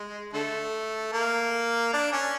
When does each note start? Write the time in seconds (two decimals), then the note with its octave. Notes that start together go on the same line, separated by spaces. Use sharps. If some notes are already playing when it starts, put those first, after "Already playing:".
Already playing: G#3
0.33 D3 A3
1.13 A#3
1.93 D4
2.13 C#4